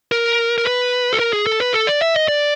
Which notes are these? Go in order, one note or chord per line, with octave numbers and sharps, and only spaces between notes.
A#4
A#4
B4
A4
A#4
G#4
A4
B4
A4
D5
E5
D#5
D5